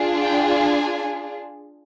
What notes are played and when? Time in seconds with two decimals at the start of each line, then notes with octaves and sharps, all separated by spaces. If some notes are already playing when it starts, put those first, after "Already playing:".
Already playing: D4 F4 G#4
0.22 G5
0.51 G#5